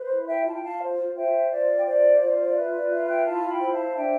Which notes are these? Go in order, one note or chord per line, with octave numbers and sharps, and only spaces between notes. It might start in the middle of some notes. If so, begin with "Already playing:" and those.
Already playing: B4 C5
E4
E5 G5
F4 A5
G5
F5 A5
C5
C5 E5 G5
F4 D5 F5
G5
C5 D5 F5
F4 D5 F5
D5
B4 E5
D5
F4 E5
E5 G5
E4 F5 A5
G5 B5
C5 B5
F5 A5
D4 E5 G5